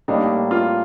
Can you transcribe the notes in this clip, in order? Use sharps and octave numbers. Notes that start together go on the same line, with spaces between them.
A2 G3 A#3 D4 D#4 G4
F4